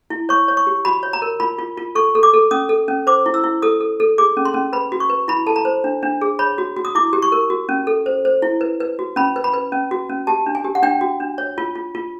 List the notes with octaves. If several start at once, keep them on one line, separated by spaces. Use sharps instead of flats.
E4
C#5 C#6
C#5
C#6
G4
F#4 B5
C#5
A#5
A#4
F4 B5
F4
F4
A4 C#6
A4
D6
A4
C#4 D#6
A4
C#4
C5 D6
E4
E6
E4
A4 D#6
A4
A4
G#4 D6
C#4
C6
C#4
B4 B5
F#4
C#6
B4
E4 B5
A4 A5
A#5
C5
D4
D4
G#4
C#5 B5
F#4
F#4
D#6
E4 D6
G4
C#6
A#4
F#4
C#4
A4
C5
C5
E4
B4
B4
F#4
C#4 B5
B4
B5
B4
C#4
F#4
C#4
G4 A5
D4
G#5
G4
F#5
D4 G5
F#4
D4
C#5
F4
F4
F4